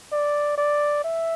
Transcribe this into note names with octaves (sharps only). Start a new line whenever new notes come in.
D5
D5
E5